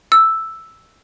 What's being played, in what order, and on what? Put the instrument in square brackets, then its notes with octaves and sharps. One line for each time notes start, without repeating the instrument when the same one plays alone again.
[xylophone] E6